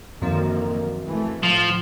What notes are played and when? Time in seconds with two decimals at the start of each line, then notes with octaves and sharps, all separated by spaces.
0.22 F#2 D3 D#3 F3 A#3 C4
1.04 E3 A3
1.43 A2 F3